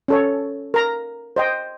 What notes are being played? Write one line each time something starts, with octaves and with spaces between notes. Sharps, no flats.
C#4 A4 C#5
A#4 A#5
C5 D#5 G5